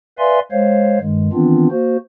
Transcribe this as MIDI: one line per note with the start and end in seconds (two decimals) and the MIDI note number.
0.18 0.39 71
0.18 0.39 74
0.18 0.39 76
0.18 0.39 77
0.18 0.39 80
0.18 0.39 84
0.52 0.99 56
0.52 0.99 72
0.52 0.99 73
0.52 0.99 77
1.00 1.29 43
1.00 1.29 51
1.00 1.29 56
1.33 1.68 51
1.33 1.68 52
1.33 1.68 59
1.33 1.68 60
1.33 1.68 62
1.33 1.68 65
1.71 1.97 58
1.71 1.97 66
1.71 1.97 72